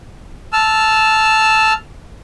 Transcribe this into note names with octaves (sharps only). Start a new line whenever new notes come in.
A5 E6 F6